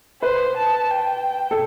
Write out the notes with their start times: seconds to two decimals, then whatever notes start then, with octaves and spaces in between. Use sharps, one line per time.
0.22 B4 C5
0.57 A5
0.91 G5
1.51 A4